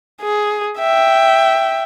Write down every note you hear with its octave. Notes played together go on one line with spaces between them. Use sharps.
G#4
E5 G5